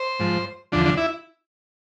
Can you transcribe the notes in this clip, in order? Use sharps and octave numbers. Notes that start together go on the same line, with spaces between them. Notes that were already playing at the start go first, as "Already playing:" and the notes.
Already playing: C5
G#2 F3
E2 D3 F3 D4
D4
E4